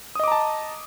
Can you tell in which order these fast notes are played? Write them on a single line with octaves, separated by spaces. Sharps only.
D#6 D#5 D6 A#5 A5